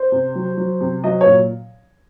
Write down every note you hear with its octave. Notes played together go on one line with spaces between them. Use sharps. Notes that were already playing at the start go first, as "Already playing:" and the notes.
Already playing: C5
C3
F#3
F#3
C3
F#3 D#5
C#5
A#2